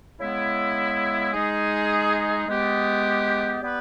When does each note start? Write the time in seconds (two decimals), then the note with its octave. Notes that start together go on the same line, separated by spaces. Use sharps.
0.18 C#3 G#3 B3 E4
1.33 G#3 D#4 G#4
2.47 G#3 B3 G4
3.61 G3 B3 G4 B4